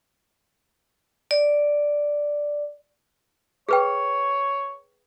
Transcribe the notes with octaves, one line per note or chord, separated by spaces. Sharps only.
D5
G#4 B4 C#5 G5